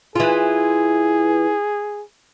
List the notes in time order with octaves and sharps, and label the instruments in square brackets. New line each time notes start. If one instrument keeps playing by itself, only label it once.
[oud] E3 F4 [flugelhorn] G#4